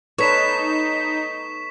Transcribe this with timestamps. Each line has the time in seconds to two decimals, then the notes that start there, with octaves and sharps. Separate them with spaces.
0.18 D#4 A4 B4 C#5 C#6 B6 E7